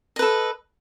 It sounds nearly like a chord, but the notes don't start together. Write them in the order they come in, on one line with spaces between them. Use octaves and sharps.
D#5 B4 A4